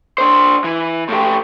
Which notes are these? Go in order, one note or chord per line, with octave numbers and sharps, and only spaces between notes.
D4 C5
E3
A2 G4